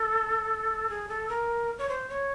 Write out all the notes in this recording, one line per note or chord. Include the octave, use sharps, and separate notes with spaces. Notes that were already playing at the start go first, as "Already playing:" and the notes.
Already playing: A4
G#4
A4
A#4
C#5
C5
C#5